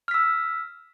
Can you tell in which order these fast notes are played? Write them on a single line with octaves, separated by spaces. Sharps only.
F6 B6 E6